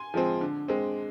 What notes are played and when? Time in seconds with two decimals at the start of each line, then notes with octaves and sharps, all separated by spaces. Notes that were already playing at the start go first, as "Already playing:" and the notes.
Already playing: G#5 C6
0.14 F3 G#3 C4
0.41 D3
0.68 G#3 C4